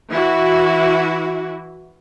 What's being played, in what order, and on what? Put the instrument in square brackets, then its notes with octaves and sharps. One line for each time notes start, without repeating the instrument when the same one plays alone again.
[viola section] E3 E4 F#4